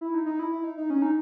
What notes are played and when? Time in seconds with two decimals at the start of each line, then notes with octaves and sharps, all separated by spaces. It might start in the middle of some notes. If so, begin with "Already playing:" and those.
0.01 E4
0.14 D#4
0.26 D#4
0.39 E4
0.52 E4
0.64 D#4
0.77 D#4
0.90 C#4
1.02 D#4